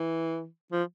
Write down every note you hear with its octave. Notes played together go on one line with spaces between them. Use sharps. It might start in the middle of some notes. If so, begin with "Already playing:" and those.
Already playing: E3
F3